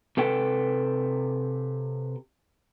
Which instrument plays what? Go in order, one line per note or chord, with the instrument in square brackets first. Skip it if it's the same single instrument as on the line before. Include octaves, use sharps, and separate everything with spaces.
[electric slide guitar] C3 A4 B4 G5